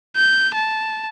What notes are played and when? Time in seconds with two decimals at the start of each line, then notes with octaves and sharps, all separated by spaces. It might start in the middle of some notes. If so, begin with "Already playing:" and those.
0.16 G6
0.55 A5